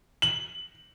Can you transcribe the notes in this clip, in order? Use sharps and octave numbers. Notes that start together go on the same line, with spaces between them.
F#7